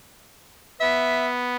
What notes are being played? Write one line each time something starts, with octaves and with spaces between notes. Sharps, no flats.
B3 E5